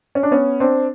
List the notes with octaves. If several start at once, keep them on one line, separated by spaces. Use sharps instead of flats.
C#4
D4
B3 C#4
C4 D4